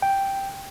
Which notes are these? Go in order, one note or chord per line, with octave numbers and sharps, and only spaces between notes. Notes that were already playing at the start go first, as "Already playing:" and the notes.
G5